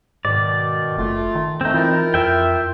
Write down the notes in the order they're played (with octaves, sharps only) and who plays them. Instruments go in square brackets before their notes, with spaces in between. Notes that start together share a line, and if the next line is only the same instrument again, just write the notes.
[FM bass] G#2 [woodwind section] B2 D#3 [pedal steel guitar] D5
[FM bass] F#1 [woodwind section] A3 F4
[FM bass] D#3
[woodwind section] A3 [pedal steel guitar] C4 D#4
[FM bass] E3 [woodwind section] E4 F4 A#4
[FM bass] F2 [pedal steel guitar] E5 G5